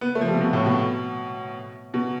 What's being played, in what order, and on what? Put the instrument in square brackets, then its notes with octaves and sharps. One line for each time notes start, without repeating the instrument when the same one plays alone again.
[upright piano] B3
A3
F3
G3
C3
B2
A2
B2
B2